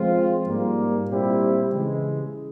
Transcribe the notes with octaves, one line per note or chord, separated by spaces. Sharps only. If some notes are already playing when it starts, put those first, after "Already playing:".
Already playing: F3 G#3 C4 F4
G#2 G3 A#3
A#2 G3 C4 E4 G4
C#3 E3 G#3